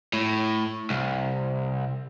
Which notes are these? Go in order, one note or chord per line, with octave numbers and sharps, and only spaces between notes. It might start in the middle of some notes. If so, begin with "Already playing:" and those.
A2
C2